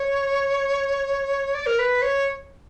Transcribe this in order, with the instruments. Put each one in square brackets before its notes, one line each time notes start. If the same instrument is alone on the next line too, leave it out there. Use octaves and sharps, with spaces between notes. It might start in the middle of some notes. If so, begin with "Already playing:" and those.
Already playing: [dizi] C#5
D5
A#4
B4
C#5